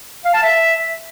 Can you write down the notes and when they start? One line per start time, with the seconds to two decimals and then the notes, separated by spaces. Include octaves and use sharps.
0.25 F5
0.34 A5
0.43 E5